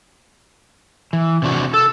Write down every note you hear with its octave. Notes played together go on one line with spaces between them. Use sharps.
E3
C3 D4 F#4
A4 E6